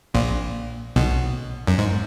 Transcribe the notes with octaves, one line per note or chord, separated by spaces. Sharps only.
A#1 A#2
B1 B2
F#2
G#2